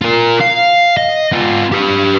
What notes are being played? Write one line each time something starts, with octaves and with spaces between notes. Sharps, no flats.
F4 A#4
F5
D#5
B3 F4
G4 B4